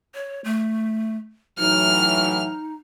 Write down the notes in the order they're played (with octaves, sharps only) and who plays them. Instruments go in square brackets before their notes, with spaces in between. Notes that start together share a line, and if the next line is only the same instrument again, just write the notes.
[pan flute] C#5
A3
[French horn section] A2 E3 F#3 [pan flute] D#4 [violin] F6